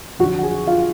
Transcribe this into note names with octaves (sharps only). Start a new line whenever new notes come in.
F2 D3 F#3 F#4 F#5
F#5
G#4 G#5
F4 F5